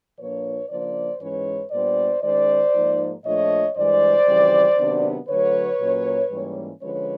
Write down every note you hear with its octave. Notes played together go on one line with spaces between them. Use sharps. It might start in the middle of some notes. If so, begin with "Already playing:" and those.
A#2 F3 A#3 D4 B4 C#5
C#3 F3 A#3 D4 C5 D5
G#2 E3 G#3 C#4 B4 C#5
A#2 G3 B3 D4 C5 D5
D#3 G#3 C#4 C5 D5
G#2 F3 A#3 D#4
A#2 F3 A3 D4 C#5 D#5
G2 E3 G#3 C5 D5
F2 C#3 E3 G3
C3 D#3 F#3 B3 D4
D3 F#3 A3 B4 C#5
A#2 F#3 A#3 C#4
G#2 E3 G3 A#3 C#4
D3 F3 G#3 C#4 B4 C#5